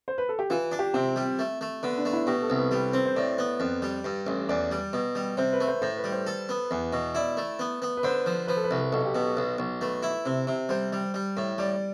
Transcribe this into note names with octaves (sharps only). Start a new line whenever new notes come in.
C5
B4
A4
G4
E3 F4
D4
G4
C3 C4
G3
A3
A3
D3 B3
D4
A3
E4
B2 G4
A4
C2
B4
G3 B4
C4
C5
A2 D5
B3
F2
G3
G2
A1
E2 D5
G3
B2
G3
C3 C5
B4
A3
C5
A2 C5
B4
G3
C5
A4
B3
E2
B2
E4 D5
A3
B3
B3
B4
D3 C5
F3
F3 B4
A4
B4
C2
B1 A4
G4
B2 A4
B1
B1
A3 B4
E4
C3
C3
G3 C5
G3
G3
A2
G3 D5